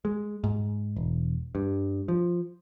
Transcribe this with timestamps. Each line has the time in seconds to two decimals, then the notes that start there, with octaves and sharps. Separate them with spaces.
0.05 G#3
0.44 G#2
0.96 E1
1.55 G2
2.08 F3